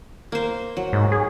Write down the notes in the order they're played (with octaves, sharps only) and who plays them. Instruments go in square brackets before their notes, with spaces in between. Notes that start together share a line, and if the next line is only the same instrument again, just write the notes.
[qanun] A#3 C5
F#3
[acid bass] G#2
G#4